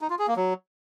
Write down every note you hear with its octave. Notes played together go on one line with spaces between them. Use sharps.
D#4
F4
G#4
A#3
F#3